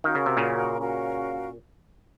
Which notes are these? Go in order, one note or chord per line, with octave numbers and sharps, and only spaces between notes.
D#3 C#4 F#4 A#4 F5
C#3
C3
A#2 C#3
C#4 F#4 A#4 F5